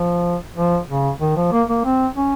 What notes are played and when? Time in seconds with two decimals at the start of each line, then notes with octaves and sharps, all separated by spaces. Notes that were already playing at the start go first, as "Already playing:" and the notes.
Already playing: F3
0.56 F3
0.88 C#3
1.21 D#3
1.37 F3
1.52 A#3
1.69 A#3
1.85 C4
2.16 C#4